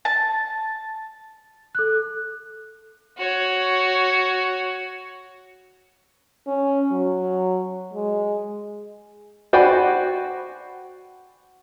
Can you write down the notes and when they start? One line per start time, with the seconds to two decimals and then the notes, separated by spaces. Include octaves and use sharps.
0.05 A5
1.75 A4 F#6
3.18 F#4 C#5
6.47 C#4
6.91 F#3
7.94 G#3
9.53 F#4 C5 D5 G5 G#5 B5